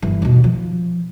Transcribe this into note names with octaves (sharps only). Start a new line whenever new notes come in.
G1 E3
D#2 B2
F3